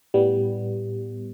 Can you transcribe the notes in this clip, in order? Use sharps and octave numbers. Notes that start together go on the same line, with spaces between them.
A2 G3 B3